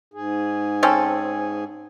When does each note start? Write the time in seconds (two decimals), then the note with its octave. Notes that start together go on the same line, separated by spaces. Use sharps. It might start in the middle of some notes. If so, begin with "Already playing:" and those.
0.14 G#2 G#4
0.83 C4 C#4 A4